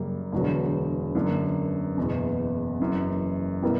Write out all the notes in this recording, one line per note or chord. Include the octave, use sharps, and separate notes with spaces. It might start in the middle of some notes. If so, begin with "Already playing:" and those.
Already playing: F#2 C#3 G3 A#3
E1 E2 D3 F#3
F#2 D3 A#3
F#1 E2 B2
F#1 F#2 E3
B2 G3 B3 E4 A#4